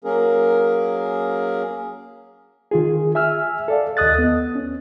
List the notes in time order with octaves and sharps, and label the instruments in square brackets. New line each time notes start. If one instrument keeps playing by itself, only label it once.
[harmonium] F#3 A#3 C#4 G#4 A#4
[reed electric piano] D#3 F4 G#4
E5 G#5 E6 F6
A4 D5 F5
D#2 A4 D#5 D#6 F#6 A6
B3
C#4